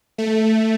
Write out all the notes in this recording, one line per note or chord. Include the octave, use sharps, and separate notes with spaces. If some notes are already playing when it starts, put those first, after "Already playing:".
A3